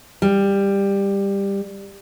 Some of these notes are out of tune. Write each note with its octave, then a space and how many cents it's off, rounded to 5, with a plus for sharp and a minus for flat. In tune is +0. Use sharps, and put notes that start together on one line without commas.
G3 +15